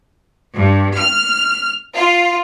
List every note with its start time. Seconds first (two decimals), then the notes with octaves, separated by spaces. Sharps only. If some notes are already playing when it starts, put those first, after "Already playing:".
0.54 G2
0.97 F6
1.95 F4